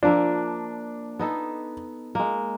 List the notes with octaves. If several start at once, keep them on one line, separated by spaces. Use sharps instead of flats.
F3 A#3 D4 E5
B3 D#4 A4
G#3 A#3